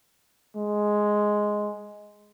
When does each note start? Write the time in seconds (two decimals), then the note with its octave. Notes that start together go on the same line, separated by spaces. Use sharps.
0.56 G#3